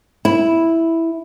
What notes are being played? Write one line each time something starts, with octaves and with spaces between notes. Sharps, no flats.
E4